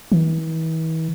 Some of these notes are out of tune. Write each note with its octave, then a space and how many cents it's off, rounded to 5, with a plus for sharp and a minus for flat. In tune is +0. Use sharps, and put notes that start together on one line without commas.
E3 -40